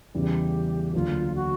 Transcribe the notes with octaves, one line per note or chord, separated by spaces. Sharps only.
E2 C#3 E3 G3 G4
D2 D3 F#3 A#3 F4
F#4